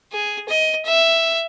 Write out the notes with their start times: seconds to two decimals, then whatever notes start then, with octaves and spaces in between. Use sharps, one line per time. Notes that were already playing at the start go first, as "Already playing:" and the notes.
0.12 G#4
0.49 D#5
0.85 E5